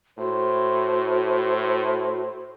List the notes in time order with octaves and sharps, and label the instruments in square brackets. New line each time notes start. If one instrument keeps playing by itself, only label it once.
[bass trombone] A2 [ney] F#4 [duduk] C5